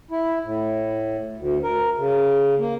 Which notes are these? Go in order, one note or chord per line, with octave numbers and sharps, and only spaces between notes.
E4
A2
D2
A#4
C#3
A#3